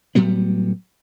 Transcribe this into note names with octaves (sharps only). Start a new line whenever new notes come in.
A2 F#3 G3 B3